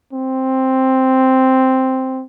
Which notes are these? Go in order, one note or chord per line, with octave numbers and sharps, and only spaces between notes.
C4